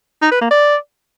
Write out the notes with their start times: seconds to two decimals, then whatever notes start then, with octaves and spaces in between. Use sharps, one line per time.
0.22 D#4
0.32 B4
0.41 A#3
0.51 D5